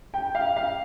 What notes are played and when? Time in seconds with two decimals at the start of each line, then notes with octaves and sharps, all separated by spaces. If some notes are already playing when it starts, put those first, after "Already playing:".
0.14 G5
0.35 F5
0.56 F5